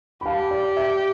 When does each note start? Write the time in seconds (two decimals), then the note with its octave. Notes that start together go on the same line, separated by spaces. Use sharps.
0.21 B5
0.26 G4 F5 A5
0.51 D5 F5
0.76 E5 G5